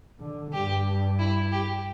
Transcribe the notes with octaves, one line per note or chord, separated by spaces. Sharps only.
D3
G2 G4
E4
G4